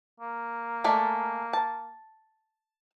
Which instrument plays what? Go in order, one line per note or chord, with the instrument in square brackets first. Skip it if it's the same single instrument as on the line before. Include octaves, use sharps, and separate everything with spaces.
[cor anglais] A#3
[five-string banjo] G#3 A3 D5
A5